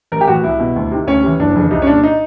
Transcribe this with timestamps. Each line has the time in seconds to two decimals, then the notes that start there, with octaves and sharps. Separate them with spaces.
0.12 A1 A#4
0.21 G4
0.27 A2 E3 F#4
0.44 C2 E4
0.60 B2
0.76 D2
0.91 C3 D#3
1.07 D2 C#4
1.23 C3 E3
1.39 F#1 D4
1.55 F2 C#3 E3
1.71 C2 D#4
1.82 C#4
1.87 A#2 D4
2.03 D#4